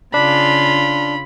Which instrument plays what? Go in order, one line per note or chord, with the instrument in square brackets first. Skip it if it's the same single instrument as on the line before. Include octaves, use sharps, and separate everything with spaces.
[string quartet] C#3 F4 [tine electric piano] D4 [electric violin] B5